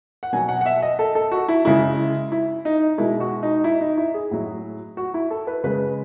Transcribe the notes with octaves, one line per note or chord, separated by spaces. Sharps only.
F#5
B2 F#3 G#5
F#5
F#5
E5
D#5
A4
A4
F#4
E4
C#3 G#3 E4
E4
D#4
B2 G#3 E4
F#4
D#4
E4
D#4
E4
G#4
A2 F#3
F#4
E4
A4
B4
C#3 G#3 B4